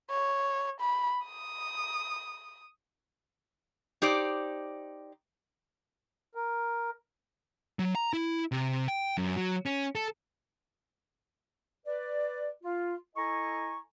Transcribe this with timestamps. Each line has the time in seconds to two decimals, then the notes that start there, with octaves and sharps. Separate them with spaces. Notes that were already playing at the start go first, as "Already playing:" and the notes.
0.10 C#5
0.81 B5
1.25 D#6
4.02 D#4 G4 C5 D5
6.35 A#4
7.79 F#3
7.95 A#5
8.13 E4
8.52 C3
8.88 G5
9.17 F#2
9.37 F#3
9.66 C#4
9.95 A4
11.86 B4 D5
12.63 F4
13.16 E4 A4 D#5 G#5 A#5 C#6